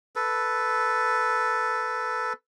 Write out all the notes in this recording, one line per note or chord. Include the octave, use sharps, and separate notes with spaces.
A4 B4